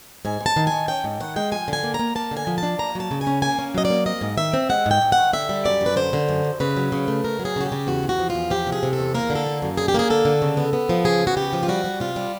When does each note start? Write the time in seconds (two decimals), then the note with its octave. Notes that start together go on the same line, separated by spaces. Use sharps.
0.25 G#2 G#5
0.41 G#2
0.46 A5
0.56 D#3
0.67 D#3 G#5
0.88 C#4 G5
1.04 G#2
1.20 D#3 F#5
1.36 G#3 G5
1.52 F3 G#5
1.68 D3 G#5
1.83 A#3
1.94 A#5
1.99 A#3
2.15 A#3 A5
2.31 D3
2.37 G#5
2.47 F3
2.58 D4 A5
2.79 A#3 A#5
2.95 F#3 A5
3.11 C#3
3.21 G#5
3.27 C#4
3.42 A#3 G#5
3.59 C#4
3.74 F#3 D#5
3.85 D5
3.90 A#3
4.06 C4 D#5
4.21 G#2
4.38 D#3 E5
4.54 C4
4.69 G#3 F#5
4.86 G#2 G5
5.02 G#2
5.12 F#5
5.17 D#3
5.33 D3 E5
5.49 G3
5.65 F#2 D5
5.81 F#2
5.86 B4
5.96 D3 C5
6.13 D3
6.29 F#2
6.45 F#2
6.60 C#3 B4
6.77 F#3
6.92 C#3
7.08 A3
7.24 C#3 A#4
7.39 F#3
7.45 G#4
7.56 C#3 F#4
7.66 G4
7.72 C#3
7.87 E2 F#4
8.03 E2
8.09 F#4
8.19 F3
8.30 F4
8.35 E2
8.50 F3 G4
8.67 C3
8.72 G#4
8.83 C3
8.93 A4
8.99 E2
9.15 A#3 A#4
9.30 D3
9.35 A4
9.46 A#3
9.62 F#2
9.77 D3 G#4
9.88 G4
9.94 A#3 G#4
10.10 D3 A4
10.25 D3
10.42 C#3
10.57 B3
10.73 B3
10.89 F3
11.05 C#3 G#4
11.21 B3
11.27 F#4
11.37 C#3 G4
11.53 F3
11.63 F4
11.68 G3 F#4
11.84 G3
12.00 C3 F4
12.16 G3